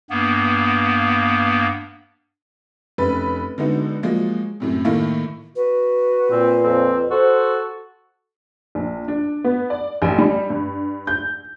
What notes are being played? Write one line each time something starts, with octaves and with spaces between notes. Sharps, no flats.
G2 A#3 B3
F1 C#4 B4 A6
D3 G#3 B3 D#4 F#4
F3 F#3 G#3 A#3
F#2 A2 C3
A2 D#3 A3 A#3 E4
F#4 B4
A#2 C4
F2 C4
F#4 A4 C5
A#1
D4
B3
D5
A1
G3
G2
G6